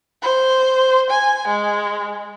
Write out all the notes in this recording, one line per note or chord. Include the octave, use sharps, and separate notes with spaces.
C5
G#5
G#3